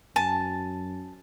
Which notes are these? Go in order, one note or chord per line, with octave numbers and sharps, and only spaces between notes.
F#2 G#5 A5